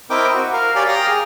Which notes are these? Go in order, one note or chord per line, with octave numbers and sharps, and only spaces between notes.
C4 E4 A#4 D#5 G5 D6
F#4
A#4 F5
G4 C#5 D5 F5 G5 G#5
F5 G5 A#5 D#6 F6
G#4